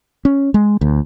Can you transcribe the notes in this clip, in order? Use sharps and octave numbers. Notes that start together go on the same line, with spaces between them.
C#4
G#3
D2